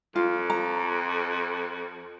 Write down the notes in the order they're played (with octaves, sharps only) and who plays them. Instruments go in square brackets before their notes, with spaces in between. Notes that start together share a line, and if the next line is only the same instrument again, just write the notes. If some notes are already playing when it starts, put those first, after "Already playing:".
[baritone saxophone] F2 [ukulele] F4
[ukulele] A#5